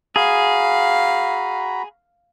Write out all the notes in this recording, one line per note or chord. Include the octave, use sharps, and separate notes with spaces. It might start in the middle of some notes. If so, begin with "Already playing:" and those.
F#4 G#4 F5 A#5 B5